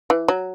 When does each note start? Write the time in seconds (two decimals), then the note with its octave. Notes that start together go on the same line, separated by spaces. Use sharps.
0.10 E3
0.28 F#3